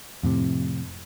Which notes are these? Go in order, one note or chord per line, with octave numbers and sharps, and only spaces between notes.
F2 A2 C3